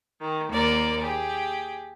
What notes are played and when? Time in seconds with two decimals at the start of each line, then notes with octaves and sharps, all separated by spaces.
0.21 D#3
0.50 D#2 A#3 A#4 D5
1.00 G4 G#4